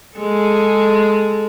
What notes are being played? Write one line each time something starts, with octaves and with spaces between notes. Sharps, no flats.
G#3 G#4 A4